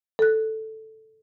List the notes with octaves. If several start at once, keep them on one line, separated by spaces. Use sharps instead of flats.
A4 F#6